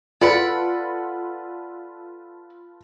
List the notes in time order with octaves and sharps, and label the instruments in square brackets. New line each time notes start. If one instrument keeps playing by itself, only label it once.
[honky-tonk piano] F4 A4 B4 [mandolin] D5 F#5 B5